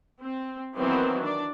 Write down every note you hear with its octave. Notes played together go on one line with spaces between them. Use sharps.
C4
D#3 E3 F#3 B3 C4
D4 D5